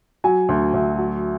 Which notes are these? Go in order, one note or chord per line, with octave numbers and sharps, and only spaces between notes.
F#3 G#5
D2
D2
F#3